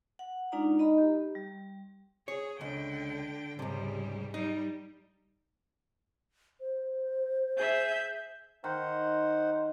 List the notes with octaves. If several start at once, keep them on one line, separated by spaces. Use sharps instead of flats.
F#5
G#3 D4 D#4 F4 D5 A#5
D#4 D#5 A#5 B5
G4
G3
G#4 C#5
C#2 D3 G5
C#2 G#2 C3 G3
G3 D#4
C5
G#4 E5 G6
D#3 D#4 C5 F#5